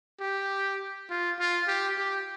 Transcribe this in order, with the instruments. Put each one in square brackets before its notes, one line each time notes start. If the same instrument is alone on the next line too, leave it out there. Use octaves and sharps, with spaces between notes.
[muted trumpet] G4
F4
F4
G4
G4